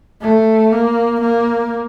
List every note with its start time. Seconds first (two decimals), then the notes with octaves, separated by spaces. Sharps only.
0.22 A3
0.72 A#3
1.21 A#3